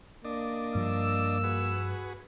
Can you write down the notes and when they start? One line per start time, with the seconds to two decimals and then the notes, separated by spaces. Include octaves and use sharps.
0.25 A#3 D4 D5 D#5
0.75 G2 F3 E6
1.44 F#4 G#4 B4